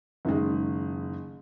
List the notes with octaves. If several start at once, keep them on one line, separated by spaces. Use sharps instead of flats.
F#1 D#3 G#3